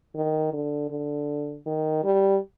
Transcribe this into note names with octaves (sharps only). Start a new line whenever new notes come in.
D#3
D3
D3
D#3
G3